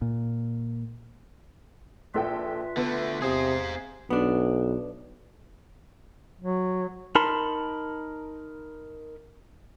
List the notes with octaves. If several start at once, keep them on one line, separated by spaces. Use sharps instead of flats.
A#2
A#1 F4 A4 B4 E5 G5
D3 A3 B3
E2 C3 G#4 C5 F5 D#6
B1 B3 D4
F#3
D#4 A#4 A5 B5 C6